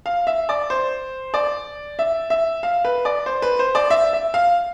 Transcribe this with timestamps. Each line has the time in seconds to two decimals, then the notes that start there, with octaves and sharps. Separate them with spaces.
0.06 F5
0.27 E5
0.49 D5
0.70 C5
1.34 D5
1.99 E5
2.30 E5
2.63 F5
2.85 B4
3.05 D5
3.26 C5
3.42 B4
3.59 C5
3.75 D5
3.90 E5
4.13 E5
4.34 F5